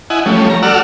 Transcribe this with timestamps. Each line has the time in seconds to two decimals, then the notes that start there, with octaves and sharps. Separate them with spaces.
0.10 E4 D#5 F#5 G#5
0.26 F3 G3 A3 C#4
0.50 A#5
0.63 F#4 A4 D5 F#5 E6 F6